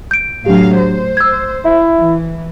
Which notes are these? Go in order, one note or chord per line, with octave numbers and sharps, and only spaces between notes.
G6 D7
A2 F#3 D4 G4 F5
C5
E6 G#6
E4 E5
E3